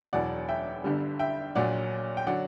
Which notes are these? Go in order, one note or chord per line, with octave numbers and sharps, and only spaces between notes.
E1 E2 B2 F#3 D5 F#5
E5 G5
G1 G2 D3 G3
E5 G5
A#1 A#2 F#3 D5 F#5
G5
D3 F#3 D5 F#5